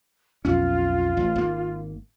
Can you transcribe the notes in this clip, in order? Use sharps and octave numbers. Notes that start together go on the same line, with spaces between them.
B1 F2 C#4 F4
A1
G#1 A#3